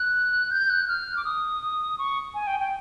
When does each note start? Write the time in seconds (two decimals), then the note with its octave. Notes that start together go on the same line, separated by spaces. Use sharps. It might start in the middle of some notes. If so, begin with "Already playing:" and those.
Already playing: F#6
0.51 G6
0.70 F#6
0.88 F6
1.17 D6
1.25 D#6
1.98 C#6
2.34 G#5
2.47 G5
2.60 G5